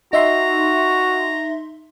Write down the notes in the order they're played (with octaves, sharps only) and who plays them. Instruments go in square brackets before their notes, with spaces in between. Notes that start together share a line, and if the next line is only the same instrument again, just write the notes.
[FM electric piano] D#4 E5 C6 [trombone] F#4 [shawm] A#5